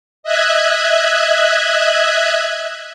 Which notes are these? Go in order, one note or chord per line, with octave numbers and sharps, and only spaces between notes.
D#5 E5 F#6 G#6